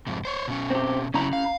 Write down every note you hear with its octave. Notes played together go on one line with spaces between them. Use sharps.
F2 G#2 C3
C5 C#5
B2 C#4
C4 G4
C#3 F#3 C#4 E4 A#5 B5
F5